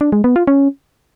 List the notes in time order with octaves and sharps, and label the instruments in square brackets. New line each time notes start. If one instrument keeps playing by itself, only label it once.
[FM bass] D4
G#3
B3
F4
C#4